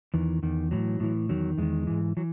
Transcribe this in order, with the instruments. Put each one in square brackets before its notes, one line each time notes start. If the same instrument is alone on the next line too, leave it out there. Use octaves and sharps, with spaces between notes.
[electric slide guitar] E2 D#3 E3
E2 D#3
A2 E3 F#3
A2 E3
E2 D#3 F#3
E2 D#3 G#3
G#2 E3
E3 F#3